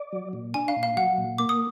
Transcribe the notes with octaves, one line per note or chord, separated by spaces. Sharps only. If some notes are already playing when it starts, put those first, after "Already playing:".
Already playing: D5
F#3
A#2
D4 G#5
F5
A#2
F5
F#3 F#5
A#2
A#3 D6
D#6